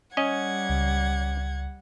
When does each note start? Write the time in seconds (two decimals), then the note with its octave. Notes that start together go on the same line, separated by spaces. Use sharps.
0.17 G3 C#4 D#5 F#5 G#6
0.70 C#2